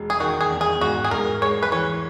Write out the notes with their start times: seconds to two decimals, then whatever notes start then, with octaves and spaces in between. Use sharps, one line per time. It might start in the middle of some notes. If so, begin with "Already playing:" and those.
Already playing: E1 G#3
0.10 G#4
0.20 D#3 F#4
0.41 G#4
0.50 E2
0.61 G#4
0.81 G#2 F#4
1.04 G#4
1.11 G#2 A#4
1.42 G#3 C#5
1.63 B4
1.72 E3 C#5